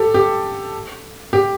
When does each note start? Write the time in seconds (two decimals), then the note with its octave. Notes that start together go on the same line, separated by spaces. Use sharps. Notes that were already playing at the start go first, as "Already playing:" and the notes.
Already playing: G4 A4
0.14 G4
1.33 G4